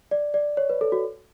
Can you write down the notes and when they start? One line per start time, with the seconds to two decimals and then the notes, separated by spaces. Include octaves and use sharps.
0.11 D5
0.34 D5
0.57 C#5
0.70 B4
0.81 A4
0.92 F#4